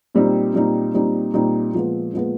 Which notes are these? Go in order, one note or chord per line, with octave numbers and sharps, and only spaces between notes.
A#2 G3 C4 D#4
A#2 G3 C4 D#4
A#2 G3 C4 D#4
A#2 G3 C4 D#4
A#2 F3 G#3 B3
A#2 F3 G#3 B3